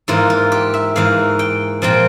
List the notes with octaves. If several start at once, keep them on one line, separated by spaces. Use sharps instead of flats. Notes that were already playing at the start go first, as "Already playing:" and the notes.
G#2 E3 A#3 F4
F4
G4
E5
G#2 E3 A#3 F5
G5
A#2 F3 C4 G5